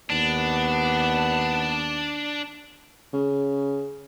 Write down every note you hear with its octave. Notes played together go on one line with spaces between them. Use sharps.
D#2 B3 D4
C#3